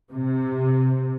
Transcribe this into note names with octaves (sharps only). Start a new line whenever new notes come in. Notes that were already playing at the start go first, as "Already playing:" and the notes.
C3